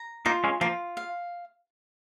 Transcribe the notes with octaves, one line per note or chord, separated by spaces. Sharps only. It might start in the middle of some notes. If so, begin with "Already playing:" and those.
Already playing: A#5
A#3 D#4 F4
G#3 C#4
F3 A#3 F4
F5